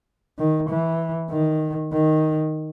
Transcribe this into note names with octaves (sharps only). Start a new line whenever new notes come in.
D#3
E3
D#3
D#3